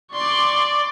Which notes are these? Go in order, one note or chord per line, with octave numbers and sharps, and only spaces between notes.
D5 C6 C#6